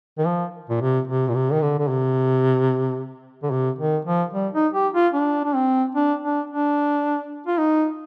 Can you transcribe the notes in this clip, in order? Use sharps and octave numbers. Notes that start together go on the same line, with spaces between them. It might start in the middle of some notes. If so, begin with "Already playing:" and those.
D#3
F3
A#2
C3
C3
A#2
C3
D#3
D3
D3
C3
D3
C3
D#3
F3
G3
D#4
G4
F4
D4
D4
C4
D4
D4
D4
F4
D#4